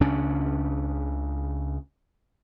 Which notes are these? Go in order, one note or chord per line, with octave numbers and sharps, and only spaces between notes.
C#2 C#3 C#4 D4